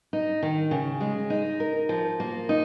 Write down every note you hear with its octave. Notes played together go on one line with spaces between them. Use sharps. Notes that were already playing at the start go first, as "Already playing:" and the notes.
D#4
D#3
C#3
G#3
D#4
A#4
F3
A#3
D#4